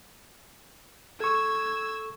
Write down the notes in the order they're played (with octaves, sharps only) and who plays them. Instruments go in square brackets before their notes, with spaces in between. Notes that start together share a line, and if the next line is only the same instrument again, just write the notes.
[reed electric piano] A4 C#6 [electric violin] E6 G#6